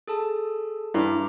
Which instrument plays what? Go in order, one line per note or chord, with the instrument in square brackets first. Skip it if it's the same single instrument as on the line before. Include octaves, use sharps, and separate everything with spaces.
[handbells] G#4 A4 A5
[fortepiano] G2 [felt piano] E4 [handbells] A#5 D6